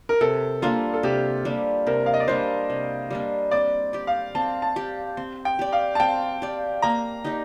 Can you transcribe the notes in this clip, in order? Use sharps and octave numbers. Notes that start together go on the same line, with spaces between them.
A#4
C3 A4
G3 A#3 D4 F4
A4
C3 G4
G3 A#3 D4
C3 A#4
F5
D#5
D5
G3 A#3 D4 C5
C3
G3 A#3 D4
C4 D5
G4 D5
F5
C4 A5
A5
G4 D5
C4
G5
G4 D5
F5
A5
C4 G5
G4 D5
A#3 A#5
D#4 G4 D5